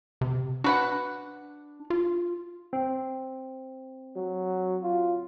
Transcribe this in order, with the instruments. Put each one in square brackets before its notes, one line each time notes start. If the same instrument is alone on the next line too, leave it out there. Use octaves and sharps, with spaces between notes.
[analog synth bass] C3
[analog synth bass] D4 [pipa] F#4 B4 F#5
[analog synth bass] F4
[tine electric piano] C4
[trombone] F#3
F4